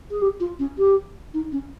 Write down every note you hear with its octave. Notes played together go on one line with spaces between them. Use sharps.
G#4
G4
F4
C#4
G4
D#4
C#4